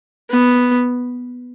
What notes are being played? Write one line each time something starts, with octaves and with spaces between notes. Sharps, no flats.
B3